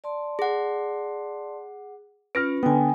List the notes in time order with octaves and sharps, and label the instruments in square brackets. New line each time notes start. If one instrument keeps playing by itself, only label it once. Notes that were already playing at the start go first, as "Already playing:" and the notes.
[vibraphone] D5 A5 C6
[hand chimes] G#4 F#5
[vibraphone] C#4 F4 [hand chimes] B4 [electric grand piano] F6 A#6 D7
[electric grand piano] D3 B3 [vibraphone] G5 G#5